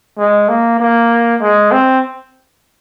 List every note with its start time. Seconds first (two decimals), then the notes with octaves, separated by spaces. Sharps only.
0.19 G#3
0.49 A#3
0.80 A#3
1.42 G#3
1.72 C4